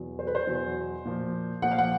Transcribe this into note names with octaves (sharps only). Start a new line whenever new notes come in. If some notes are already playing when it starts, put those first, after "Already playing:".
Already playing: E2 B2 F#3
C5
B4
C5
E2 B2 F#3
A#2 F3
A#2 F3 F#5
F5
F#5